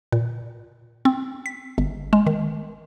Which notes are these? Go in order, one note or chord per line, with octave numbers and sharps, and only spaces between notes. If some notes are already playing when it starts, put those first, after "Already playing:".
A#2
C4
B6
G1
G#3
D#3